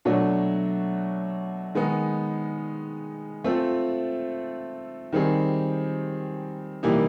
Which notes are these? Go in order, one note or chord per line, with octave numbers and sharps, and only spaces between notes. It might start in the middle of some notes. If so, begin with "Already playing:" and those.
B2 F#3 A3 D4 F#4
D#3 G#3 B3 D#4
A3 C4 F4 A4
D#3 G3 C4 D#4 G#4
C3 E3 G3 A#3 D#4